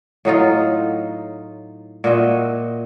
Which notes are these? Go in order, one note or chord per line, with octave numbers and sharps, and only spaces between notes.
A2 F#3 D#4 F4
A#2 F#4 D#5 E5